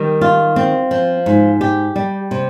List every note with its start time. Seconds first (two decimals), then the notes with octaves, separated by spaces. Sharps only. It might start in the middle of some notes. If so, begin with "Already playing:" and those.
Already playing: D#3 G3
0.21 F4
0.56 C4
0.91 F3
1.26 G#2
1.61 G4
1.96 G3
2.31 C3